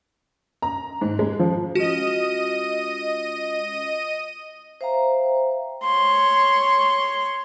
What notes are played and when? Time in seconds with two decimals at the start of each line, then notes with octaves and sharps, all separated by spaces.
0.62 A#5
1.01 G#2
1.19 G#3
1.39 F3
1.75 G#3 C#4 F4 F#4 D#5 D#7
4.81 C5 E5 F5 G5 A#5
5.84 C#5 C6